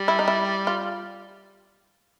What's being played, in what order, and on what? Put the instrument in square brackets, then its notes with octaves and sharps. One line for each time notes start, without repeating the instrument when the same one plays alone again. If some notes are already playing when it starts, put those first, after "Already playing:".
Already playing: [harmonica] G3
[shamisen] E4
D#4
E4
F4